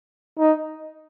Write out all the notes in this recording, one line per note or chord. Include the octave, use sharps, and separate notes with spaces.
D#4